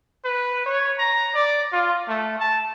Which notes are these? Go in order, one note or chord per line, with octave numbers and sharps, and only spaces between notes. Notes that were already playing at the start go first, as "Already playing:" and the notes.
B4
C#5
A#5
D5
F4
A3
A5